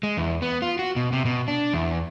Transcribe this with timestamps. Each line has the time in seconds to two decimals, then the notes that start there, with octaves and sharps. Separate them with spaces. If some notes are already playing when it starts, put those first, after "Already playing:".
0.03 G#3
0.17 E2
0.42 B3
0.62 F4
0.79 F#4
0.96 B2
1.13 C3
1.25 B2
1.48 D4
1.74 E2